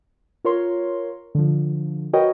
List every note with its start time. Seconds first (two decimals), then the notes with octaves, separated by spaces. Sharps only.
0.45 F4 A#4 C#5 C6
1.35 D3 F3
2.13 F#4 A#4 B4 C#5 D#5 G5